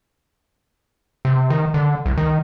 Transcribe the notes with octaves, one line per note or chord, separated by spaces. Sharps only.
C3
D#3
D3
C2
D#3